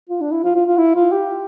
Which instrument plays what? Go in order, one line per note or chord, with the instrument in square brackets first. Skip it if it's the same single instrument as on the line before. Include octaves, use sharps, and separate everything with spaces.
[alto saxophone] F4
D4
E4
F4
F4
F4
E4
F4
G4